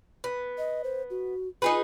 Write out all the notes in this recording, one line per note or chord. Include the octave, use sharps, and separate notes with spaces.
B3
D#5
C5
F#4
D#4 F4 G#4 B4